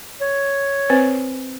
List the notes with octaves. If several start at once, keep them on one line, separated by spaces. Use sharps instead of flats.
C#5
C4 B4 C5